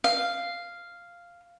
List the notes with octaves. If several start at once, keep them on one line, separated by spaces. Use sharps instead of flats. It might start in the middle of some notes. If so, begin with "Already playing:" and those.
F5